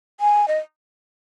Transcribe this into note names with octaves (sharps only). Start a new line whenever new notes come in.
G#5
D#5